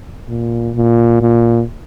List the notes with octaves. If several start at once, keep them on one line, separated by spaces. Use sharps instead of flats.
A#2
A#2
A#2